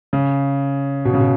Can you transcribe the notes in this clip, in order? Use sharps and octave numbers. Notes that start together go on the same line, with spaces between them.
C#3
B2
C#3
B2